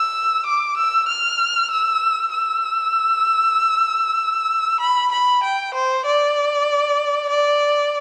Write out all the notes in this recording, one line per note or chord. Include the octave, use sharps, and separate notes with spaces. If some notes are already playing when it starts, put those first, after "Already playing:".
Already playing: E6
D6
E6
F6
E6
E6
B5
B5
G5
C5
D5
D5